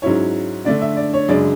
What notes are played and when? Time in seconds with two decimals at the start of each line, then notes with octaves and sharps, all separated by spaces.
0.02 G#2 F#3 C#4 E4 C#5
0.65 D3 A3 D4 D5
0.82 E5
0.97 D5
1.14 C#5
1.28 F#2 C#3 G#3 D4 D5